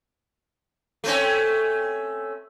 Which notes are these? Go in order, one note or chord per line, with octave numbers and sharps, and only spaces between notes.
A3 C4 C#4